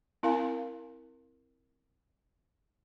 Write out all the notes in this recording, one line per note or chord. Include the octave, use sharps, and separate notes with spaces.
C4 E4 A#4 F5 G#5